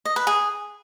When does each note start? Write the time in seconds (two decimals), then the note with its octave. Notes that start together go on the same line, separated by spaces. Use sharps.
0.05 D#5
0.16 B4
0.27 G#4